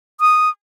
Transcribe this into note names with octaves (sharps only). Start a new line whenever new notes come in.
D#6